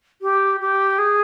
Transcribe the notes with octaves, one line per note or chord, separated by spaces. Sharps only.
G4
G4
G#4